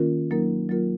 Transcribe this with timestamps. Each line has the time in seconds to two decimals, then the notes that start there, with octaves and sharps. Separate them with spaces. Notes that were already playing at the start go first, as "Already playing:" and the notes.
Already playing: D#3 A#3 C#4 F4 A#4
0.31 F#3 A#3 D#4 A#4
0.69 F#3 A#3 F4 A#4